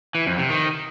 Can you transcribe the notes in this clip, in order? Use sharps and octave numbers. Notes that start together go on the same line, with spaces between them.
E3
F2
C3
D#3